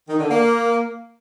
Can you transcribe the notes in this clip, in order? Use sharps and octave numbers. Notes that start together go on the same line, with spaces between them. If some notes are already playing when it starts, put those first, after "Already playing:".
D#3
D3
A#3